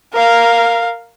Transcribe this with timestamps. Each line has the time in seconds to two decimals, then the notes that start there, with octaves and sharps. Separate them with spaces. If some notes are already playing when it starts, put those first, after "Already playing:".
0.13 A#4 F5